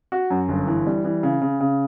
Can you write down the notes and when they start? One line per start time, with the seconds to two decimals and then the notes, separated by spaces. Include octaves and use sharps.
0.12 F#4
0.30 F#2
0.49 G1
0.67 E3
0.87 G3
1.04 E3
1.23 C#3
1.42 C#3
1.60 C#3